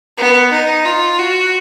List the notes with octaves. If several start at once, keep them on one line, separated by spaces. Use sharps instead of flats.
B3
D#4
F4
F#4